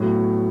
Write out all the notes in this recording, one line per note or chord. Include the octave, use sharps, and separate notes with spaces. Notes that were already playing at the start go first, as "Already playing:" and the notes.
Already playing: A2 F#3 B3